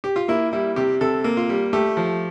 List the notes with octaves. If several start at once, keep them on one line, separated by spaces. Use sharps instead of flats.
G4
F4
A#3 E4
G3 E4
C3 G4
C3 A4
A#3
F4
G3
A3 G4
F3